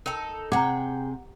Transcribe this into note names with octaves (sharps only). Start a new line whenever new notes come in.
D#4 A4 A#4 G5
C3 G#4 F#5 G5 A#5 D6